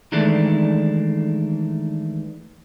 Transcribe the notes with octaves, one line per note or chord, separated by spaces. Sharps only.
D#3 E3 G#3 A3 D4